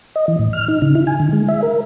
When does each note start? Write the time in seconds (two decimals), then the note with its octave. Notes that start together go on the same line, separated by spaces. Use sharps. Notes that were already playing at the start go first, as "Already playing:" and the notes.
0.16 D#5
0.28 E3
0.39 A2
0.53 F6
0.68 D#4
0.82 C#3
0.95 E4
1.07 G#5
1.20 D3
1.33 G#3
1.49 E5
1.63 A#4